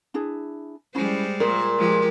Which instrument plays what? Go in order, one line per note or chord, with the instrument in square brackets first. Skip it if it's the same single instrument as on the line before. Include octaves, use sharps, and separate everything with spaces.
[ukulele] D4 E4 G#4
[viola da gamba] G3 G#3 C5 [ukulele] C#4 E4 B5
[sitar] A#2 [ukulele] F4 G#4 A#4
[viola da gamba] F3 G#3 G4